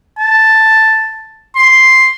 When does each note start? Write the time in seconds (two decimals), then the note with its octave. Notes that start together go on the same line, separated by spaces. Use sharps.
0.18 A5
1.56 C6